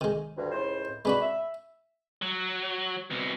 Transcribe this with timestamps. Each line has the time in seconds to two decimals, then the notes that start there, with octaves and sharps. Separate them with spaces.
0.01 D#3 G#3
0.37 D2 G2
0.52 C#2 A2 C5
1.05 G#3 D4 F#4 B4 B5
1.20 E5
2.22 F#3
3.10 C2 B2